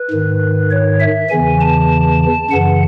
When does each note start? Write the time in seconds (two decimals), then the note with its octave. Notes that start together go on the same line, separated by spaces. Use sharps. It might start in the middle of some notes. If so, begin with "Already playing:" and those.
Already playing: B4
0.11 G#2 D#3
0.71 C#5
1.00 E5
1.30 E2 C#3 E3 G#5
1.60 A5
2.51 F#2 C#3 E3 F#5